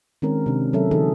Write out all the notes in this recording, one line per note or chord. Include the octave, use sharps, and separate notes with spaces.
D#3 G#3 C4 C#4 A#4
C3 D4
F#3 C#4 A4 E5
D3 E3 D#4 G#4 A4